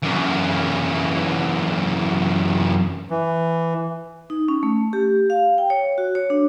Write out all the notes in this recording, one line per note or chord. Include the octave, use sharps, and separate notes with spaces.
F#2 E3
E3
D#4
C#4
A3
G4
F5
G5
C#5
F#4
C#5
D4